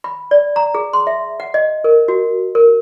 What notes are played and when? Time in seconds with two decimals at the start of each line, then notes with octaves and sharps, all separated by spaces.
0.04 B5
0.31 D5
0.56 A#5
0.75 G#4
0.93 C6
1.07 E5
1.40 F#5
1.54 D#5
1.84 A#4
2.08 F#4
2.55 A#4